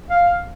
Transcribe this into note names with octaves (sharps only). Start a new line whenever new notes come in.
F5